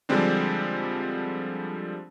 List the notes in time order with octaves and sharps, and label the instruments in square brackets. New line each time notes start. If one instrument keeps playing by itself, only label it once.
[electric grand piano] D3 F3 G3 G#3 C4 D4